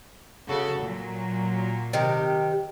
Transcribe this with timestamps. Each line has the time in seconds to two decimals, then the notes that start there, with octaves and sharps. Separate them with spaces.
0.48 C#3 F#4 A4
0.80 A#2 F#3
1.93 C3 D#3 G4